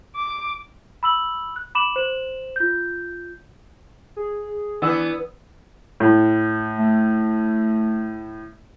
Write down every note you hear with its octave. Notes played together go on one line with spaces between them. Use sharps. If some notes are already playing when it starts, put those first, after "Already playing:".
D6
B5 E6 F#7
F#6
B5 D6 E7 F#7
C5 E7 F#7
F4 G6
G#4
E3 B3 D4 E6
A2
A3